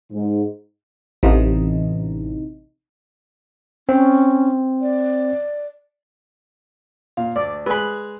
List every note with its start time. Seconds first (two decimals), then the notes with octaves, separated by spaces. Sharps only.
0.12 G#2
1.23 A1 C3 E3 D#4
3.89 C4 C#4
4.81 D5
7.17 A#2 F5
7.36 D2 D5
7.66 G#3 G#4 B4 B5